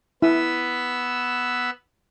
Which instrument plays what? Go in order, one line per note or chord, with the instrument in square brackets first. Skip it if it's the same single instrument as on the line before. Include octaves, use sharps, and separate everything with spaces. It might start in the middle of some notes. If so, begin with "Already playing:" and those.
[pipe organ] B3 B4 E6 [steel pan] E4